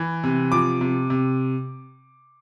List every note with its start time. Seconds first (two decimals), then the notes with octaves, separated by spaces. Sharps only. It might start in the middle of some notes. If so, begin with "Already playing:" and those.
Already playing: E3
0.24 C3
0.52 F3 D6
0.81 C3
1.10 C3